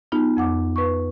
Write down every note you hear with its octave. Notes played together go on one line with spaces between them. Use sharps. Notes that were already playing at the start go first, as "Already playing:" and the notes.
B3 D#4 F4
F2 F#5 D6
B4 C#6